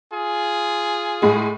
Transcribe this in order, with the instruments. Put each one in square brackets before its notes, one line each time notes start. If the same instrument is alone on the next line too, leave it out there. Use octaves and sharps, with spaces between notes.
[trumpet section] F4 G#4
[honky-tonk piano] A2 G#3